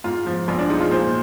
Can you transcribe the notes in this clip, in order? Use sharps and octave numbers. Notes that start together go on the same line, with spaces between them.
G#2 F4
F3
A#1 F4
D4
G#3 D#4
F4
A#2 C5